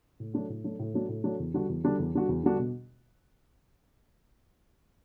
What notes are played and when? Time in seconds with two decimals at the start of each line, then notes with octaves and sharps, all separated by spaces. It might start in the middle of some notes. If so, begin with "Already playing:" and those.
0.20 A2
0.34 F#3 A3 D4 F#4
0.49 A2
0.64 F#3 A3 D4 F#4
0.79 A2
0.94 F#3 A3 D4 F#4
1.09 A2
1.24 F#3 A3 D4 F#4
1.40 E2
1.54 D3 G3 D4 F#4
1.69 E2
1.84 D3 G3 D4 F#4
1.99 E2
2.14 D3 G3 D4 F#4
2.29 E2
2.43 D3 G3 D4 F#4
2.58 B2